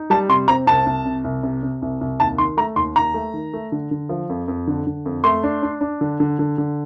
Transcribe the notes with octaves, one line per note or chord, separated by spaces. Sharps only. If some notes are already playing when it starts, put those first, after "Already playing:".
Already playing: D#4
G3 A5
C3 C6
C4 A#5
C2 A5
C2
C3
C2
C3
C3
C2
C2
D#2 A5
D#3 C6
A3 A#5
D#2 C6
D#2 A#5
A3
D#3
A3
D3
D3
F3
F2
F2
D3
D3
F2
A3 C6
D4
D4
D4
D3
D3
D3
D3